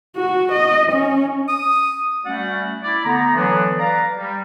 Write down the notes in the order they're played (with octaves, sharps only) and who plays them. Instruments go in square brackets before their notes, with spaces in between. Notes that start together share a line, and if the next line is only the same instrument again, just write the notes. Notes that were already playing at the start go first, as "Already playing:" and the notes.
[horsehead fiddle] F#4
D#5
C#4
[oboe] D#6
[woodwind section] G3 A3 C#4 F#4 D5 F#5
E4 D5
D3 A3 B3 A#5
D3 E3 F#3 B3 D4
B4 D5 F5 A#5
G3